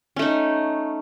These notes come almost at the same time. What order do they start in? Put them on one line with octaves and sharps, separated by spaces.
C#4 A3 D#4